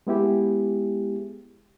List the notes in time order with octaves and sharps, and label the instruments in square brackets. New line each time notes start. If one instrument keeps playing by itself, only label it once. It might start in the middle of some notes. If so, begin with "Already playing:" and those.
[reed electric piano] G#3 B3 E4 G4 G#4